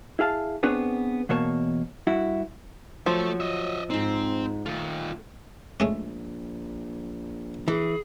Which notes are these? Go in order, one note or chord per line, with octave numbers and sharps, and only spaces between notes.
E4 G#4 F5 A5
B3 C4 D4 G#4 B4 C#5
E2 B2 A#3 C#5 A5
G2 E4 F#4
F3 F#3 A3 E5
D#5 E5
G#2 C4 D#4
D#3 A3 F4
A#1 G#3 A3 C#4
E3 G#4